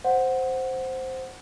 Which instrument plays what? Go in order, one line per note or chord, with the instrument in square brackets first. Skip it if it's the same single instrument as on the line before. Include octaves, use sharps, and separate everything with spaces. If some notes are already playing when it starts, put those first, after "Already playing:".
[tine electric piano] C5 [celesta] F#5